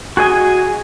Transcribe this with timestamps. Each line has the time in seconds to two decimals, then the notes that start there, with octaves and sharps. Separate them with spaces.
0.17 F#4 G#4 D#5 G#5